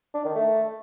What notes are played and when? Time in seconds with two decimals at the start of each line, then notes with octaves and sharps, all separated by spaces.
0.14 D4
0.25 D#3
0.35 A3